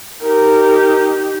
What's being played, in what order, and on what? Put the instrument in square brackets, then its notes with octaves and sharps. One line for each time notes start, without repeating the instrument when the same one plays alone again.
[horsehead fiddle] D#4 G4 [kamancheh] A#4